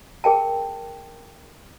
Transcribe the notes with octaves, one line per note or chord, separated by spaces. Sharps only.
G#4 A#4 G5 A5